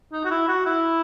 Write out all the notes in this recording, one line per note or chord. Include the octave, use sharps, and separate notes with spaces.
D#4
F#4
E4
F#4
E4